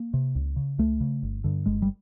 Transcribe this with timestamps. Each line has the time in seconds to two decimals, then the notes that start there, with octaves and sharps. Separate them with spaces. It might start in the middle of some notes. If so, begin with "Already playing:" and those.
Already playing: A#3
0.14 C3
0.35 C#2
0.56 C#3
0.78 C#2 A3
1.00 C#3
1.23 G1
1.44 G2 D3
1.66 G1 G#3
1.82 G3